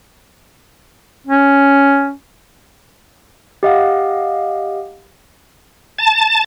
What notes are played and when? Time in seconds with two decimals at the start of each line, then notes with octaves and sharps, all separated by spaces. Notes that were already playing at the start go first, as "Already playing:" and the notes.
1.27 C#4
3.63 G4 D#5 F5 F#5
5.98 A5